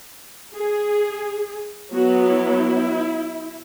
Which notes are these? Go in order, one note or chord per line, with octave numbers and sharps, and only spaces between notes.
G#4
F#3 B3 F#4
E4